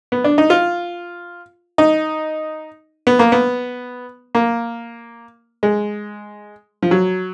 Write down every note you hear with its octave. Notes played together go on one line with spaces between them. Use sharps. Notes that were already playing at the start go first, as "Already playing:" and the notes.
B3
D4
D#4
F4
D#4
B3
A#3
B3
A#3
G#3
F3
F#3